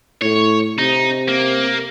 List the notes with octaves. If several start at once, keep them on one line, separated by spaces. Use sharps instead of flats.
A2 C#5
C3 D#4
A#3